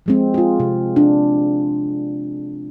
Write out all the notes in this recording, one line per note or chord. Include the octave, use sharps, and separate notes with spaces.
F3 G#3 C4
F4 G#4
C3
D4